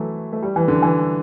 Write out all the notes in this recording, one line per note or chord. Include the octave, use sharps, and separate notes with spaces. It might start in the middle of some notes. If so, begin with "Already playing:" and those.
Already playing: E3 F#3 A3
A3
G3
E3
D3
E3